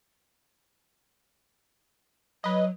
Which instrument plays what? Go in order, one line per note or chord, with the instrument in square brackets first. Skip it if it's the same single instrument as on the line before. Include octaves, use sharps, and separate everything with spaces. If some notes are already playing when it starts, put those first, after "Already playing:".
[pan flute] F#3 [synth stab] B4 D#5